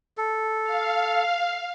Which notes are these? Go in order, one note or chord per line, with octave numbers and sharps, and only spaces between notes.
A4
F5